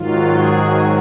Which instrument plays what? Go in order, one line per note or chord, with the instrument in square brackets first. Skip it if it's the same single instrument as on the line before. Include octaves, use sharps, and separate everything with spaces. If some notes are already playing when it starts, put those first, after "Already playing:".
Already playing: [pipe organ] G#2 D#3 F#3 F4
G#4